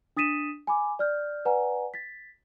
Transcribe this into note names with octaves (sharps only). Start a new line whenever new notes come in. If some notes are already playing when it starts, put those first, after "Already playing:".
D4 D#6 A6 B6 D#7 E7
G#5 B5 D6
D5 F6 G6
B4 D5 F#5 G#5 A#5
A6 B6